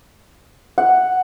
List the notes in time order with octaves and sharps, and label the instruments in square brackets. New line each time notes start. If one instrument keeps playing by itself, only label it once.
[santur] F#5